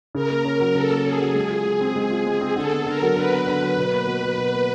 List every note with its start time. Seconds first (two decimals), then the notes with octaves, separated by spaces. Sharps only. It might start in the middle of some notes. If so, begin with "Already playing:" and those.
0.15 C#3 A#4
0.30 A#3
0.45 C#4
0.60 F#3
0.75 C#3 A4
0.90 A#3
1.05 C#4 G#4
1.21 F#3
1.35 G#3
1.50 F4
1.66 G#3
1.81 C4
1.96 G#3
2.10 F4
2.26 G#3
2.41 C4
2.56 D3 A4
2.71 B3
2.86 D3 A#4
3.02 F#3
3.17 D3 B4
3.31 B3
3.47 D3
3.62 F#3
3.77 B2
3.92 A#3
4.07 B2
4.22 F#3
4.38 B2
4.52 A#3